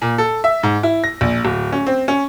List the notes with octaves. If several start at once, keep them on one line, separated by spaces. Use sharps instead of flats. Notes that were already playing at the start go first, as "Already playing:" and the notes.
A#2
A4
E5
G#2
E4
A#6
A#1
D1
C#4
C4
C#4